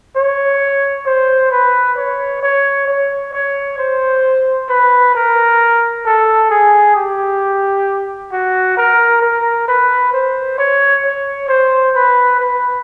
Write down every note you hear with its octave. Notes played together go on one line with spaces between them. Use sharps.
C#5
C5
B4
C#5
C#5
C#5
C#5
C5
B4
A#4
A4
G#4
G4
F#4
A#4
A#4
B4
C5
C#5
C#5
C5
B4
B4